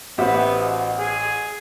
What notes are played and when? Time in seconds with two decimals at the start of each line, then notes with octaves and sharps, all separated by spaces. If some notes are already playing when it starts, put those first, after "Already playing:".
0.18 A1 B3 G4 C5 E5
0.59 B2
0.99 G#4